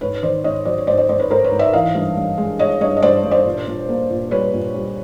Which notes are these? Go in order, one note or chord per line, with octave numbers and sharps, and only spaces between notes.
G#2 B4 C#5
D#3 C5 D5
G#2 C#5 D#5
F#3 C5 D5
C#5
G#2 C5 D5
C5 D5
G#2 C5 D5
B4 C#5
G#2 A#4 C5
B4 C#5
G#2
D5 E5
E3 D#5 F5
G2
G2
G#3
G#3 C#5 D#5
G2 C#5 D#5
D#5
G2 C5 D5
G2
C5 D5
A#2
A#2
A#3
A#2
G3 B4 C#5
A#2
G3